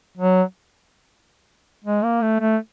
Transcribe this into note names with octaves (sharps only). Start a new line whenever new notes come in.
F#3
G#3
A#3
A3
A3